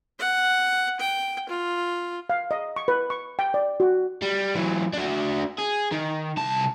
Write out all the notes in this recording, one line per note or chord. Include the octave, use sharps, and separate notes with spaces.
F#5
G5
F4
F5
D#5
C#6
B4
C#6
G5
D5
F#4
G3
E3 F#3
D4 F#4
G#4
D#3
C2 A5